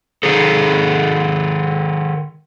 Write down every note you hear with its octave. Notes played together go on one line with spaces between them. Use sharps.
D#3 D#4 G#4 A4